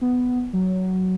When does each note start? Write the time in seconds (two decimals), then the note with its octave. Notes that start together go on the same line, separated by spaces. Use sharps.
0.01 B3
0.53 F#3